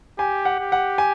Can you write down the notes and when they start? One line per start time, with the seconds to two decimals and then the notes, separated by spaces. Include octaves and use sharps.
0.19 G4 G#5
0.45 F#5
0.59 G4
0.72 F#5
0.98 G#5